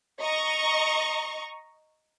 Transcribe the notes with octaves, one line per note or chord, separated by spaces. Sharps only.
D#5 A#5 C#6